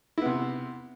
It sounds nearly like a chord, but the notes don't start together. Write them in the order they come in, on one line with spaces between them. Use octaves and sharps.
E4 B3 C3